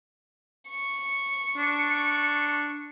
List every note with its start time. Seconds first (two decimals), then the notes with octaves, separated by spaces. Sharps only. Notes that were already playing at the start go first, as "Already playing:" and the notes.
0.69 C#6
1.57 D4